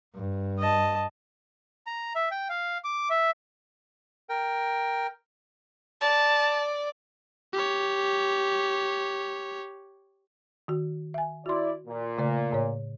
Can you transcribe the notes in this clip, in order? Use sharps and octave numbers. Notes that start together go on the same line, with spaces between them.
G2
D#5 A5
A#5
E5
G5
F5
D6
E5
A#4 G5
D5 A5
G4 C#5
D#3 F#4
E5 G#5
E4 F#4 D5 C6
A#2
C#3 A3 D5
A2 C#5